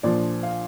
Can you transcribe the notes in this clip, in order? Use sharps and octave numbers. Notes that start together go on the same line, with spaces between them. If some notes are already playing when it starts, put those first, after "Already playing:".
A#1 A#2 F3 D4 D5
F5